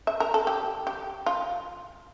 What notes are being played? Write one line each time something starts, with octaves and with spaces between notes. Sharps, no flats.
E5
A#4
A4
G4
G4
F4